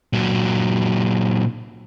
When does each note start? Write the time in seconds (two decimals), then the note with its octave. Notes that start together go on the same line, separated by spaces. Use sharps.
0.13 A#2 F#3